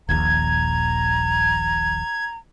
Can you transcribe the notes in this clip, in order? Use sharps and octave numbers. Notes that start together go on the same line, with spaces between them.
D#1 A#1 D#2 A#5 G#6